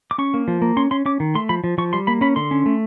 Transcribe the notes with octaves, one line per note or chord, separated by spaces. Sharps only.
D6
C#4 C#6
A#3
F3
A#3
C#4 C6
C#4 C6
C#4 D6
D#3
A3 C6
F3 B5
F3
F3 C#6
G3 C6
A#3 B5
C#4 B5
D3 C6
C#4
A3